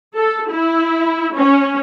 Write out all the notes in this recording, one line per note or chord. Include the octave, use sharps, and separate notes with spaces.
A4
E4
C#4